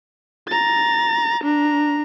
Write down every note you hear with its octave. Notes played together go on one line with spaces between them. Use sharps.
A#5 A6
D4 A#5